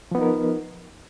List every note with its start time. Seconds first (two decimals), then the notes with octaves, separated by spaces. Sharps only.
0.11 F3
0.15 B3
0.18 D#4
0.21 A#4